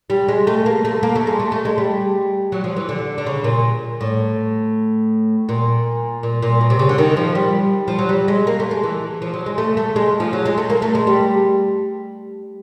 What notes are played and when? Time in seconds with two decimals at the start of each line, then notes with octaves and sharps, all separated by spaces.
0.10 G3
0.29 G#3
0.47 A3
0.66 A#3
0.85 A3
1.03 A#3
1.15 A3
1.27 G#3
1.39 A3
1.52 A3
1.65 G#3
1.78 G3
2.52 F#3
2.64 F3
2.76 E3
2.89 D3
3.18 D3
3.26 C#3
3.44 A#2
4.01 A2
5.49 A#2
6.23 A#2
6.42 A#2
6.61 B2
6.70 C3
6.79 C#3
6.89 D3
6.98 D#3
7.17 F3
7.35 G3
7.88 F3
7.99 F#3
8.09 G3
8.28 G#3
8.47 A#3
8.60 A3
8.71 G#3
8.83 E3
9.22 F3
9.34 F#3
9.46 G#3
9.58 A3
9.77 A3
9.96 G#3
10.20 F3
10.33 F#3
10.46 G#3
10.58 A3
10.70 A#3
10.82 A3
10.95 G#3
11.07 G3